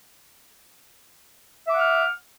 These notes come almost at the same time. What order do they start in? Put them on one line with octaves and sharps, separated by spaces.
E5 D6 F#5 F6